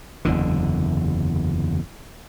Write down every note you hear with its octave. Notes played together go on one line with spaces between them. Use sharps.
F#1 E2 D3